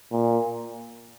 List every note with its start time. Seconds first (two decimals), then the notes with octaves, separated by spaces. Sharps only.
0.12 A#2